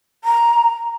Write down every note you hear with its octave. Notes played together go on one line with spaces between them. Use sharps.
A#5